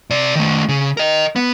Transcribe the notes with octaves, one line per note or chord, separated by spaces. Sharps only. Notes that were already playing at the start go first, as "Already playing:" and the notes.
C3 D5
D#3 A3
C#3
A#4 D#5
B3